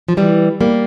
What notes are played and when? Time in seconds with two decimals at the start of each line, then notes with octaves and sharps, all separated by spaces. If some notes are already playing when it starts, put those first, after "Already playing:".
0.08 F3
0.17 E3 G3
0.61 G3 A#3